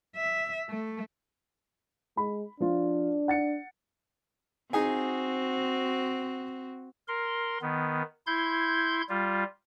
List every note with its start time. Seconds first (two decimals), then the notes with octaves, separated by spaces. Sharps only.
0.16 E5
0.70 A3
2.17 G#3 B5
2.60 F3 D4 F4
3.28 F#5 A6 C#7
4.73 C4 D#4 F#4 G#4 G#5
7.08 A#4 C6
7.62 D#3 B3
8.27 E4 C6 G6 G#6
9.09 G3 F4